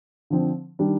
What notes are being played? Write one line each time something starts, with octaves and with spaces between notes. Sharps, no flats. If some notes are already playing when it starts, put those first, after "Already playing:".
D3 F3 C4
D#3 G3 D4